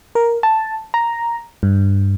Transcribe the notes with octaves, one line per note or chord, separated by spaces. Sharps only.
A#4
A5
A#5
G2